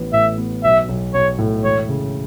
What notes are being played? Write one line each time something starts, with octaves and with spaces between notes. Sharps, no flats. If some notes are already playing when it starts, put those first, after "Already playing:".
Already playing: A1 B3
A2 E5
B3
B1 E5
B1
B1 C#5
A2
E1 C#5
C#3